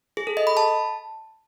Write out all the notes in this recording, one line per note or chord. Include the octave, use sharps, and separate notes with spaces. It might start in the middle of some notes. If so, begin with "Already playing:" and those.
G#4
A4
D#5
B5
A5